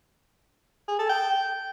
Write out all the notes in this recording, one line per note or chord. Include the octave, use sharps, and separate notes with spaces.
G#4
A4
G5